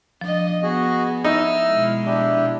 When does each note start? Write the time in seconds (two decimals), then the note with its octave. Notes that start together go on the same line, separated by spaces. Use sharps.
0.21 F3 D4 D#5
0.63 B3 F#4 G#4 D#5
1.24 D#4 E4 E6 F6
1.70 B2 G#3
2.06 D4 E4 G4